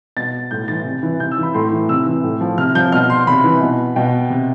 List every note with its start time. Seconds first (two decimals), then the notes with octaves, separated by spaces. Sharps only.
0.16 B2 A6
0.51 A2 G6
0.68 E3 A6
0.85 C3
1.03 E3
1.20 C3 G6
1.32 E6
1.38 E3
1.43 B5
1.54 A2 C6
1.72 E3
1.89 C3 E6
2.06 E3
2.24 A2
2.41 F3
2.58 C3 F6
2.75 F3 G6
2.92 B2 F6
3.10 C6
3.27 C3 B5
3.44 E3
3.61 B2
3.96 B2 G5
4.30 C3